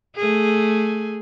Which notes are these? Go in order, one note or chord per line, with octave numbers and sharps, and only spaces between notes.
A3 G#4